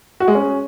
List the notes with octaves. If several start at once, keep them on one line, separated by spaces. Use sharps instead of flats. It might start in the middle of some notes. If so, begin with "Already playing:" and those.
F#4
G#3
C#4